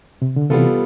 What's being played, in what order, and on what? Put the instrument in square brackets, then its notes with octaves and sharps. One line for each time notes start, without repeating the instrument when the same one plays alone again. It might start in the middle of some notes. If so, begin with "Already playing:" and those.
[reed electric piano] C3
D3
[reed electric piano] C3 E3 [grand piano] G3 B3 F4 A4